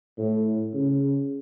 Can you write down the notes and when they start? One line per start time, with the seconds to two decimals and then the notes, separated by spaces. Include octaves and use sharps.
0.18 A2
0.74 C#3